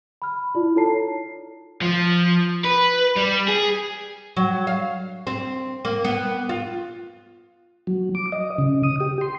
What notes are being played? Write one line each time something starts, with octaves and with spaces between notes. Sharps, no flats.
B5 F6
E4 F4 D5
D#4 A4 C#5 A5 A#5 C7
F3
B4
G3
G#4
F#3
F5
C4
A#3
B3
F4
F#3
D6
D#5
C#3
D#6
G4
C6